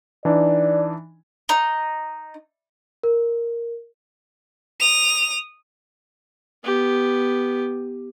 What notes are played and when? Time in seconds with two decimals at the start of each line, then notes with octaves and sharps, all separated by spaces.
0.25 E3 D4 D#4 D5
1.49 D#4
3.03 A#4
4.80 D#6 F7
6.64 B3 G4